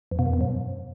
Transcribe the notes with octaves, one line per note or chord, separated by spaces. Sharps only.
F2
B2
E2
B2
F#2